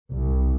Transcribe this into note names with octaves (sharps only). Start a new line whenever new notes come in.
C2